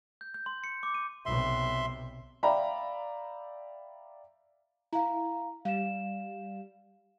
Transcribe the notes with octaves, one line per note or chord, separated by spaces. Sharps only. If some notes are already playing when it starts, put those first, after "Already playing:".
G6
G6
C6
C#7
D6
D#7
B1 C3 E5 C6
D5 E5 F5 G5 A#5 B5
E4 F5 A#5
G3 F5 E7